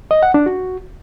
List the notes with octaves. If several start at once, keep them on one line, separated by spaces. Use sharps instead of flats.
D#5
F#5
D4
F#4